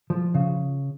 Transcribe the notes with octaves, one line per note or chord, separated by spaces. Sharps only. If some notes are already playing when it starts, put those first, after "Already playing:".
F3
C#3